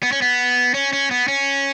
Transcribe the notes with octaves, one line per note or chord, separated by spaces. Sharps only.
B3
C#4
B3
C#4
C#4
B3
C#4